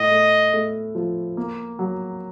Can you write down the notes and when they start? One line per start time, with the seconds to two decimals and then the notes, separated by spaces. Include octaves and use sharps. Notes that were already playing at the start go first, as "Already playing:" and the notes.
Already playing: A2 D#5
0.11 A3
0.53 A3
0.95 F3
1.37 A#3
1.79 F#3